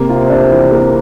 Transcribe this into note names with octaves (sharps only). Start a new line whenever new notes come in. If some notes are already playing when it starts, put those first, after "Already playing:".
Already playing: C3 A#3
F4
D4
E3
A#3